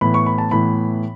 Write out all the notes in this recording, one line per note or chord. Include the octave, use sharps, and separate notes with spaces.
A2 E3 B3 B5
C#6
B5
A5
A2 E3 B3 B5